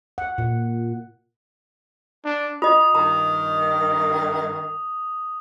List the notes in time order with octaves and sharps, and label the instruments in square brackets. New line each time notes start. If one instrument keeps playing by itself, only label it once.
[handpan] F#5
A#2
[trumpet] D4
[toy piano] F4 D#5 [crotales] D#6
[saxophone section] G2 D#3 [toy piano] A#5